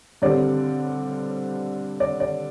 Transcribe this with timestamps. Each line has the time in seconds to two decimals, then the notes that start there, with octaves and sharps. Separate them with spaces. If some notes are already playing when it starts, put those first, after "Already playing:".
0.22 G2 D3 G3 C4 D5
2.00 D5
2.20 D5